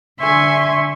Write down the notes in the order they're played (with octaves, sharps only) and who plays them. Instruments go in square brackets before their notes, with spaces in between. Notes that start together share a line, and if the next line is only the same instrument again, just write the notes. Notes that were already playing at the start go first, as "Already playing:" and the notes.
[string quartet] D3 E5 G#5 C6 C#6